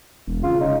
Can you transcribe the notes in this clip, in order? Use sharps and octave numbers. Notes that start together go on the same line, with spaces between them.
E1
C#3 F4
D#4